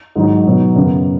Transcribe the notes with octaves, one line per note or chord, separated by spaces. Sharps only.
G#2 F#3 D#4
B2 F#3 B3 D#4
F#2 C#3 B3